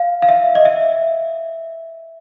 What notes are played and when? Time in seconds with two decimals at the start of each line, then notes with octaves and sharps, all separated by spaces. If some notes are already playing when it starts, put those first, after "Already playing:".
Already playing: F5
0.22 F5
0.29 E5
0.55 D#5
0.65 E5